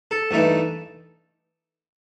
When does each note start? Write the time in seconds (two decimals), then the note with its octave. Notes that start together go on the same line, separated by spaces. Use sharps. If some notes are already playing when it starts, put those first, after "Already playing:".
0.11 A4
0.31 G2 E3 A3 D#4